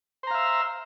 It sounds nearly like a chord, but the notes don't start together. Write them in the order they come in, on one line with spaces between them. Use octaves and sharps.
C5 A#5 F5 E5